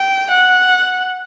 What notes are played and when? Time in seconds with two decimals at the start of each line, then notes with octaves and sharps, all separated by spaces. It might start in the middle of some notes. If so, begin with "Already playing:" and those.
Already playing: G5
0.31 F#5